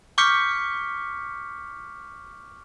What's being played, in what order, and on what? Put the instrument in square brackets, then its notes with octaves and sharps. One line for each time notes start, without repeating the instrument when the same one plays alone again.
[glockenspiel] C#6 D6 F6 G6 B6 C#7